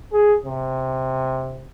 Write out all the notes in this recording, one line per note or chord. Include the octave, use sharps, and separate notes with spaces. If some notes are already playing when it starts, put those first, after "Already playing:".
G#4
C3